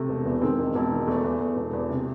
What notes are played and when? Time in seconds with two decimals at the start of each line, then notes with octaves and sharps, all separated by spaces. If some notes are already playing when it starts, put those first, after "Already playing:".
Already playing: C3 A3
0.09 E1
0.25 E2
0.41 D#3 G#3 C4
0.59 E1
0.75 E1
0.91 D#3
1.07 E2 A3
1.24 E2
1.41 E2
1.57 E1
1.73 E2
1.89 C3